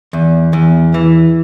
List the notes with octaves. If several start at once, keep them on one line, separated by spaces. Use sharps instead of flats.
E2
E2
E3